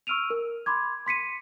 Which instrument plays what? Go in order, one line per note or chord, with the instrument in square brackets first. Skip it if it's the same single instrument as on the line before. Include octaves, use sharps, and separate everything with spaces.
[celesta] C#6 E6 F6 D7 D#7 F7
A#4
B5 C6 D6 G#6
C6 B6 C#7 D#7